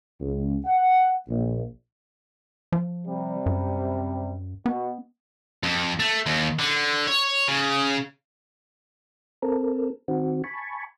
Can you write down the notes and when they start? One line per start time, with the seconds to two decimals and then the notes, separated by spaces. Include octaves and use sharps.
0.21 C#2
0.65 F#5
1.29 A#1
2.72 F3
3.06 C3 G3
3.46 F#2
4.66 B2 B3
5.63 F2
5.99 A3
6.26 D#2
6.59 D3
7.07 C#5
7.48 C#3
9.42 C4 A4 A#4
10.08 D#3 C4 F#4
10.44 G#5 A5 B5 C#6